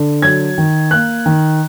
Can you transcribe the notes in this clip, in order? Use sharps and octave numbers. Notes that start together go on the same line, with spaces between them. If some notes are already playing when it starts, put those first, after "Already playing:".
Already playing: D3
F#3 G#6
D#3
A#3 F#6
D#3